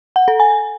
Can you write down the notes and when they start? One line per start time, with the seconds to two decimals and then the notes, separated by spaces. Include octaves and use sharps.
0.16 F#5
0.28 A4
0.40 G#5